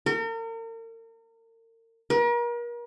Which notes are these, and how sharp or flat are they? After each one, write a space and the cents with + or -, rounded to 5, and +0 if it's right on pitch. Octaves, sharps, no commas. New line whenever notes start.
A#4 -40
A#4 +40